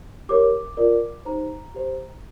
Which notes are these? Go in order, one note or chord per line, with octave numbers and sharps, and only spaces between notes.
G4 A#4 C#5 D6
F4 A#4 D5
D#4 G4 C5 A#5
G4 C5